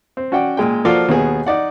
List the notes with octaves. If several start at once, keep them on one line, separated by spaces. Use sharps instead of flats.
C4
C#4 F#4 D5 F#5 G5
A#2 G#3 G5
F3 A#3 F4 F#4 A4 D5
D#2 B2 B3 G#4
D#4 D5 F#5